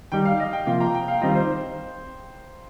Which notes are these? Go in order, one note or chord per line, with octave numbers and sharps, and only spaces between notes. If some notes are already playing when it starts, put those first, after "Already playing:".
D#3 G3 D#4 G5
F5
D#5
G5
C3 F3 A#3 F4 G5
A#5
G5
F5
D#3 G3 C4 F4 D#5
C5